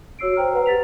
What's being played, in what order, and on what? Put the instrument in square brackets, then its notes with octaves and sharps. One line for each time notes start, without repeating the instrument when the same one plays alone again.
[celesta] F#4 C#5 E6 C7 D7
C5 G5 A#5 F6
B4 F#5 A#5
G4 A6 B6 F7